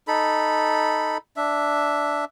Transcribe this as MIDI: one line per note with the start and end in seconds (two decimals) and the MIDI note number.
0.08 1.18 63
0.08 1.18 69
0.08 1.18 83
1.36 2.25 62
1.36 2.25 76